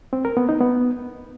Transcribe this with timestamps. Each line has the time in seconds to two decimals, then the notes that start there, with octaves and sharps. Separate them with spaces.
0.13 C4
0.25 A#4
0.37 B3
0.49 D#4
0.61 B3